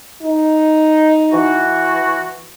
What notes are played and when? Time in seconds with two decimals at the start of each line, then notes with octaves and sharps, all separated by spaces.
0.23 D#4
1.33 E3 F#4